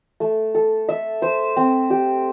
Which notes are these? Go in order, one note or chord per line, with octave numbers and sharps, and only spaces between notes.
A3
A4
E5
C5
C4
G4